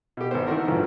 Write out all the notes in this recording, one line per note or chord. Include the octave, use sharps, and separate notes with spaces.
B2 G4
G#1 B3 C5
D#3 E3 A3 F#4 A#4
A1 G2 A#2 E3 F3 B4